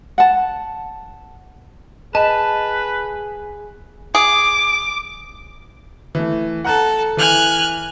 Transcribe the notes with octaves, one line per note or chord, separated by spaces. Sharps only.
F#5 A5
G#4 B4 D#5 A5
G#4 D6
E3 A3
A4 F#5 A#5 F#6
E3 G#5 F6 F#6